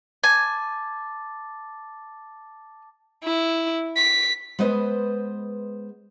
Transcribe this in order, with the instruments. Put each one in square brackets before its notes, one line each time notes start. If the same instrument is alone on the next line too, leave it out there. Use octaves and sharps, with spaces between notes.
[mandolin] G#5 [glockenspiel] A5 D6 A6
[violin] E4
B6
[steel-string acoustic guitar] G#3 B3 B4 C5 D#5